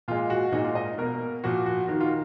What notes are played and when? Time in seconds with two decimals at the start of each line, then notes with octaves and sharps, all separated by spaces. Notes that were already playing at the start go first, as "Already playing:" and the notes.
0.08 A#2 G#3 F4
0.30 F#4
0.52 A#2 G#3 D#4
0.64 F4
0.75 D#5
0.98 B2 A#3 A#4
1.44 A#2 F3 A#3 F#4
1.66 F#4
1.88 D#3 A#3 F#4
2.00 F4